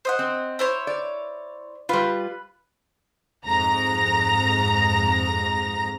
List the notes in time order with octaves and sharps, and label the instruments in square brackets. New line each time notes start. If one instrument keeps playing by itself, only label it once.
[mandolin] C5 D#5 F#5
[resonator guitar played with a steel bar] C4
[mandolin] E4 C5 C#5
[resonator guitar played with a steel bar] D5
[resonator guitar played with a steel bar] G3 F4 [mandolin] B4
[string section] F2 G#2 A#5 A#6